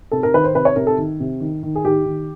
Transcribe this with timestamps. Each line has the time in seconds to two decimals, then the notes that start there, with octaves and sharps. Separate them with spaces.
0.11 C3 A4
0.23 A#4
0.34 D#3 B4
0.44 C5
0.55 C3 B4
0.65 C#5
0.76 C3 A#4
0.87 A4
0.98 D#3
1.20 C3
1.41 D#3
1.63 D#3
1.75 G#4
1.85 D#3 G4
2.05 D#3